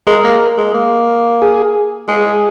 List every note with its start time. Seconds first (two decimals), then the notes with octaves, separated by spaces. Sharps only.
0.07 G#3 A#4
0.24 A#3
0.58 G#3
0.74 A#3
1.42 G#4
2.08 G#3 G#4